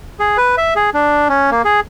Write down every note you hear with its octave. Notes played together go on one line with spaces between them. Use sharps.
G#4
B4
E5
G#4
D4
C#4
A#3
G#4